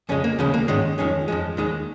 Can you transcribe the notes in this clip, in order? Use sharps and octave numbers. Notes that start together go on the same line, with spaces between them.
F2 C#3 G#3 C#4
A#3
D#2 C#3 F3 G#3 C#4
A#3
G#2 D#3 G#3 C#4
F2 D#3 G#3 C#4
F2 F3 G#3
D#2 D#3 G#3